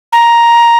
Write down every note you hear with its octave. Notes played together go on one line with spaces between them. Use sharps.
A#5